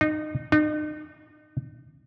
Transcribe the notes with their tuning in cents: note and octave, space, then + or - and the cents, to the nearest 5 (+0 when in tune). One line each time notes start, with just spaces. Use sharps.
D#4 -25
D#4 -40